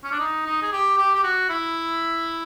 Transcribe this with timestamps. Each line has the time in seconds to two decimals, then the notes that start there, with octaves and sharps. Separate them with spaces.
0.04 C#4
0.11 D4
0.20 D#4
0.46 D#4
0.62 G#4
0.72 G4
0.98 G4
1.15 G4
1.24 F#4
1.49 E4